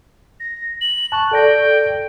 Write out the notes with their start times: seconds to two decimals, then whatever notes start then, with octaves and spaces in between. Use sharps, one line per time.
0.40 A#6
0.81 F#7
1.12 A5 C#6 F#6
1.31 A4 D5 G5 A#6